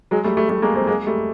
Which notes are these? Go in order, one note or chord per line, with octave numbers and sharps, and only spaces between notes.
F#3 G#3
G3 A3
G3 A3
G3 A3
G#3 A#3
A#3 C4
G#3 A#3
G3 A3